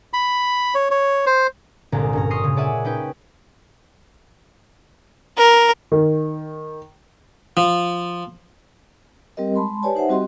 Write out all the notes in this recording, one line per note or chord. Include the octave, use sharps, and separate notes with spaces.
B5
C#5
C#5
C5
G1 C2 A#2 G#3 D5 A#5
G2 C#4 A#5
C6 C#6 D#6 F6 A#6 C7
A#2 C#3
G#4 C#5 D5 E5 F#5 G#5
C#4 D#4 B4 G5
A#4
D#3
F3
G3 C4 G4 A#4 D#5
G#3 A5 B5 C6
G4 B4 C#5 D5 G#5 A5
D#4 C5 E5 F#5
G3 C4 F#4 G4 D#5 C6